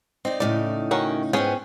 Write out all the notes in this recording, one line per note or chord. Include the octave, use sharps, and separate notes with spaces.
C4 D#4 D5
A2 C#3 D#4 D5
D#3 C#4 F#4
G#2 B3 C#4 G#4 G5